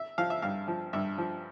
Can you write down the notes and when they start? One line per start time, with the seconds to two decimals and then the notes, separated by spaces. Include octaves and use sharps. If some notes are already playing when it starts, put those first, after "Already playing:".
Already playing: E5
0.18 F3 F5
0.30 E5
0.42 G2 F5
0.68 F3
0.93 G2 E5
1.18 F3